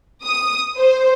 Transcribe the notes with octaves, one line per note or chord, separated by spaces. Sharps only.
D#6
C5